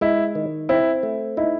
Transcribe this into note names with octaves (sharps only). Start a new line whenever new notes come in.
G#3 E4
D#3
C4 E4
A3
D#4 E4